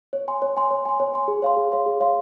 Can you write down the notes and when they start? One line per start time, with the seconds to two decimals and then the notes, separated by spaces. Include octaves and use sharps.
0.13 C#5
0.28 G#5 C6
0.42 C#5
0.57 G#5 C6
0.71 C#5
0.85 G#5 C6
1.00 C#5
1.14 G#5 C6
1.28 G#4
1.42 C#5 F5 C6
1.57 G#4
1.72 C#5 F5 C6
1.86 G#4
2.00 C#5 F5 C6